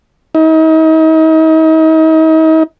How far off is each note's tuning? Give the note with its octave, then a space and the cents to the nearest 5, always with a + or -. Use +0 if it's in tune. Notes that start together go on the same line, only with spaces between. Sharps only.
D#4 +40